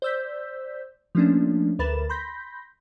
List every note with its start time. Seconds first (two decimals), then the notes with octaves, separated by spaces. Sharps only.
0.02 C5 D5 E6 G6 B6
1.15 F3 A3 A#3 C#4 D4
1.79 D2 A#4 B4 B5 A6 E7
2.09 B5 C6 G6 A#6 B6